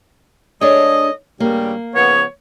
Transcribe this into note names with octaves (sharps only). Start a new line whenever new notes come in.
G#3 D4 G#4 A4 C#5 D#5
G2 C#3 G3 A#3
C#3 F3 B3 C#5